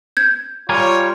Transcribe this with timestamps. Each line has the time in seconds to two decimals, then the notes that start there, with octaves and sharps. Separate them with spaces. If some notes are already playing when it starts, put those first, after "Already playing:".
0.17 G6 G#6
0.69 G3 F4 A#4 C#5 G#5